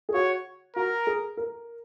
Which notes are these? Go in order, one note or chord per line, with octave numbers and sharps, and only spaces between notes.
G#4
F#4 C#5
F#4 A#4
G#4
A#4